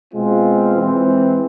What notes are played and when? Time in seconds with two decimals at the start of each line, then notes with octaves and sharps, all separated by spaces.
0.14 B2 G#3 C4 F4
0.75 E3 G#3 C4